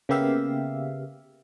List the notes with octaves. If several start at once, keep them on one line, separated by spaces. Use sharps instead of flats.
C#3 A#3 B3 G4 E5 F5